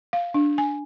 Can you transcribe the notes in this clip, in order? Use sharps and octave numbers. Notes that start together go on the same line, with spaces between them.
F5
D4
G#5